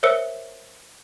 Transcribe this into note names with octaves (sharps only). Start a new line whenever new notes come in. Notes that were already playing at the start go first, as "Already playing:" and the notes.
A#4 C5 C#5 E5 E6 C#7